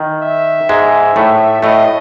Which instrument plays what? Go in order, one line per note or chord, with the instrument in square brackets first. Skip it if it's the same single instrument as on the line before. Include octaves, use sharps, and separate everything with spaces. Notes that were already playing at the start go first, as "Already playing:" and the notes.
Already playing: [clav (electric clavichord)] D#3
[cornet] E5
[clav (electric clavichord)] G#2 G#3
A2 A3
[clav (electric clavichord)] A2 A3 [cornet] D#5